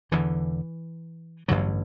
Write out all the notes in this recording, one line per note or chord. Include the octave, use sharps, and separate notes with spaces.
E1 E2 D3 E3
A1 G2 D3 F#3